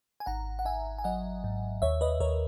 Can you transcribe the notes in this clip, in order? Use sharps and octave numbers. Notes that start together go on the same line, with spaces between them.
G#5
G#1 F#5 A#5
F#5
G#1 E5 G#5
G#5
F#3 D#5 F#5
G#2
D#2 C#5 E5
B4 D#5
D#2 A#4 C#5